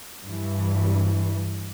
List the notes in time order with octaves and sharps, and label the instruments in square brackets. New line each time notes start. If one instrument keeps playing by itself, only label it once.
[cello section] G2 E3